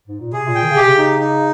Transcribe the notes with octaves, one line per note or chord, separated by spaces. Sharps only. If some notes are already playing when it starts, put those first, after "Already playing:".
G#2
A#2
C3 G#4
A#2
G5
D#3
C#3
C3 G4
C#3
D#4
D#4